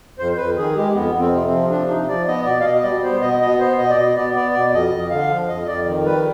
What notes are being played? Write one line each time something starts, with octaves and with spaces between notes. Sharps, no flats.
F2 C5
C5
F2 B4
D#3 G#4
G#3 G4
F2 B3
F2 B3
C4
C3
C4
F3
C3 D4
C3 D#4
F3 D5
B3 D#5
B2 D5
F5
B2 D#5
D#5
G3 D5
B3 C5
B2 D#5
B3 D#5
B3 C5
B2 D#5
D5
B2 D#5
B3 D5
B3 D5
B2 D5
F2 D#5
F2
D3 F5
F3
F2 D#5
D#5
F2 D5
D#3
G3 B4